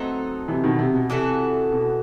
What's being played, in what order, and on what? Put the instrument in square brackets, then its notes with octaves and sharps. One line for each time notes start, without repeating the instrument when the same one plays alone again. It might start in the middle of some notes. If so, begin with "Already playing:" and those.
Already playing: [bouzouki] F#3 B3 D#4 A4 [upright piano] A3 C4
[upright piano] C3 E3
B2 D#3
C3
B2
[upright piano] C3 [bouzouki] E3 B3 F#4 A4
[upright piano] B2